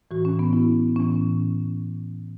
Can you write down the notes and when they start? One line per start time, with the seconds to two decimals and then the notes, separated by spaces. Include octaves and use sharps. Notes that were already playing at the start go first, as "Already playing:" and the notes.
0.11 A2 E3 F#4
0.25 C#4
0.39 B3
0.53 E4
0.96 A2 E3 C#4